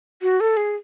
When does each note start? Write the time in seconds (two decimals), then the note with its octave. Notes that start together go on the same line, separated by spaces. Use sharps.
0.22 F#4
0.40 A4
0.57 G#4